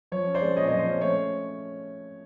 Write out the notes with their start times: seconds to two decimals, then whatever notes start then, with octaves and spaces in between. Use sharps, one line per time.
0.12 F3 C#5
0.27 C#4
0.35 C5 D5
0.42 G#3
0.57 A#2 C#5 D#5
0.68 F3 C#5 D#5
0.79 C5
0.86 C#4
1.01 A3 C#5